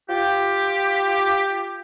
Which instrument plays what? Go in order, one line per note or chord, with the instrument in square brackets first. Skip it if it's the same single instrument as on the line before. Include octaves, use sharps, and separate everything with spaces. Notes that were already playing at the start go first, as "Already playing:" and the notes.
[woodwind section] F4 G4